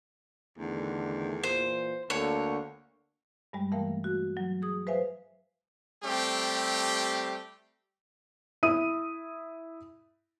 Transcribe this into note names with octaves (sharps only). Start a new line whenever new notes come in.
E2 D3 D#3 A3
A#2 E3 C5
D2 D3 A#3 C#5
G2 G3 G#3
E3 A3 A#3 A#4 F5 G5
F#4
F#3
G#4 D#6
B4 C5 E5 F5 G#5
G3 A3 C4 G4
E4 D#6 D#7